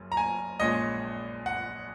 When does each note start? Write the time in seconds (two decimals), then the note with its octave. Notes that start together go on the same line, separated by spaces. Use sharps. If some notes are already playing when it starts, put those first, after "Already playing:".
Already playing: F#1 F#2
0.12 A#5
0.17 G#5
0.60 A#1 A#2 G#3 C#4 D#5
1.46 F#5